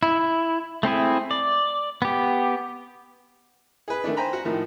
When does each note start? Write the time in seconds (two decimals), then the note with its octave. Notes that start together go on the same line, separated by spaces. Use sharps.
0.03 E4
0.83 A3 C4 E4 G#4
1.31 D5
2.02 B3 G4
3.88 G#4 B4
4.04 D#3 A3 D4
4.17 C5 G5 G#5 A#5 B5
4.33 F#4
4.45 A2 D#3 F3